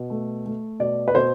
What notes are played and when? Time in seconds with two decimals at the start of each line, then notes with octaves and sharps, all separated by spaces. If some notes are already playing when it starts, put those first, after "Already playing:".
Already playing: B2
0.10 A3
0.46 A3
0.80 B2 D5
1.08 B4
1.15 B2 C5